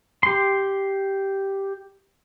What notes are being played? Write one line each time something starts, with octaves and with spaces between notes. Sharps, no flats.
G4 C6